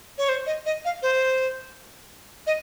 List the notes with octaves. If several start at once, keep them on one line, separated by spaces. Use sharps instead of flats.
C#5
C5
D#5
D#5
F5
C5
D#5